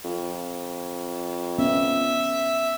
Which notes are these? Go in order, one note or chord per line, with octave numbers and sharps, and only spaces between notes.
F2
B3 C#4 E5